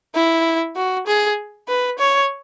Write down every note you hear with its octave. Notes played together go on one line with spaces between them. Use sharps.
E4
F#4
G#4
B4
C#5